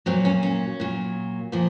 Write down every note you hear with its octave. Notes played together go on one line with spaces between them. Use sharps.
A#2 F#3 C4
C#4
C#4
A#2 F#3
A#2 F3